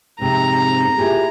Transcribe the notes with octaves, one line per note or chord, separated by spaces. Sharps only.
F2 G#2 C3 C4 A#5
A#2 E4 G4 G#4